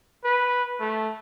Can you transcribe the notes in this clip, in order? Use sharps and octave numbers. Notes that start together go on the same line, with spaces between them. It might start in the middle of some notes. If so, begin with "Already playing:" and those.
B4
A3